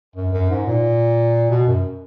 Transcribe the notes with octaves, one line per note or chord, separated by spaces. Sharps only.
F#2
F#2
G#2
A#2
B2
F#2